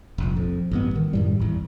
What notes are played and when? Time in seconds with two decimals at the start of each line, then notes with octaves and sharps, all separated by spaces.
0.18 F1 A#1
0.36 F2
0.71 A1 G2 B3
0.96 D#3
1.13 F#2 A2 G3
1.40 G#1 E2